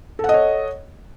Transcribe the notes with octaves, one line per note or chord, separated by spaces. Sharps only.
A4 C#5 D#5 F#5